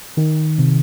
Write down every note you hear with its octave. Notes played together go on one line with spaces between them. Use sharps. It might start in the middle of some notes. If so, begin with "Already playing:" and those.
D#3
C3